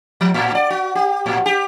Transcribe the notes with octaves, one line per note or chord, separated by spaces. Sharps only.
F3
A2
D5
F#4
G4
A2
G4